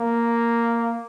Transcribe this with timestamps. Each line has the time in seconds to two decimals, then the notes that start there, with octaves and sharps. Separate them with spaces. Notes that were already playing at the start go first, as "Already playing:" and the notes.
Already playing: A#3